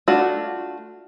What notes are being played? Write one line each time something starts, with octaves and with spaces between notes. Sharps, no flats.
A3 D4 F4 F#4